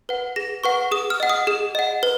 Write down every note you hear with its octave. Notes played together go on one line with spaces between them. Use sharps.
B4 F#5
G#4 A#6
B4 F#5 C#6
G#4 D#6
F6
D#5 F#5
D#6
G#4
D#5 F#5
B4